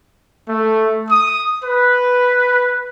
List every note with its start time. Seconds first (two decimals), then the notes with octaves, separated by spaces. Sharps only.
0.48 A3
1.10 D#6
1.64 B4